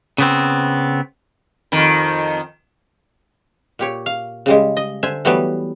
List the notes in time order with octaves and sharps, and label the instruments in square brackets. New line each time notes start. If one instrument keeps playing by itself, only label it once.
[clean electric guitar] C#3 B3 C4
[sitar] F2 D#3
[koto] A#2 G4 C#5
F5
C#3 G3 G#3
D#5
D3 C5 E5 G#5
E3 F#3 G3 A3 B3